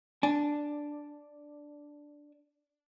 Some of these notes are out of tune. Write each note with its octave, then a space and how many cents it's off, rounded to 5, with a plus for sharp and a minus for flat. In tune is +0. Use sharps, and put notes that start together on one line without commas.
D4 +0 G#5 +25